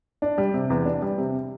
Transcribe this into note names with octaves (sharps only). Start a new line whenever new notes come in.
D4
G3
C3
E2
D4
G3
C3